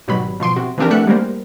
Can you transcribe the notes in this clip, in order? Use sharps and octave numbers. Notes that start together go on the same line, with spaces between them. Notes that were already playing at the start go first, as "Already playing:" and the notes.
G#1 B2 F#3 G3 B5
B2 F3 C6 D7
C3 F#4
E3 F3 C4 D4 G4 A#4
E3 A3 E5 F#5 F#6 C#7
G3 G#3 A#3 A#4 C5